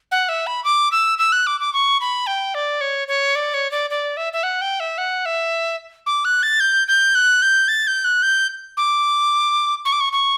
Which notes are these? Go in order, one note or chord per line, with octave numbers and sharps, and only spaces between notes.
F#5
E5
B5
D6
E6
E6
F#6
D6
D6
C#6
B5
G5
D5
C#5
C#5
D5
C#5
D5
D5
E5
E5
F#5
G5
E5
F#5
E5
D6
F#6
A6
G6
G6
F#6
G6
A6
G6
F#6
G6
D6
C#6
D6
C#6
C#6